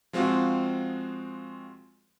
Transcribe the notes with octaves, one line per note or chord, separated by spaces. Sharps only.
F3 G#3 C4 F4 F#4